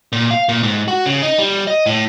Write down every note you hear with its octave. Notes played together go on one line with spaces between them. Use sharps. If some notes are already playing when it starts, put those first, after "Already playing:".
A#2
F5
A#2
G#2
F#4
C#3
D#4
G3
D#5
A2